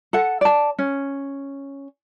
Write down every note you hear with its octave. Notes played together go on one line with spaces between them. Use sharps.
A4 F#5
D5 A5
C#4